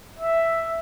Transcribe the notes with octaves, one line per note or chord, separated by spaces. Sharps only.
E5